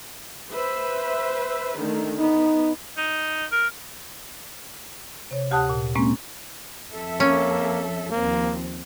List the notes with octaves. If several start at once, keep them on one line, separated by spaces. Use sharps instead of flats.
B4 C5 E5
D3 D#3 A3
B3 D#4
D#4
A#4
C3 C#5
D2 G4 F#5 A5 D#6 F#6
A#2
A#2 G#3 A#3 C4 C#4
F2 A4 E5
A#3 C#4
D#2 F3 A#3 C4